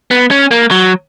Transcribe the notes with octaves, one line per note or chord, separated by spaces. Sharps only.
B3
C#4
A#3
F#3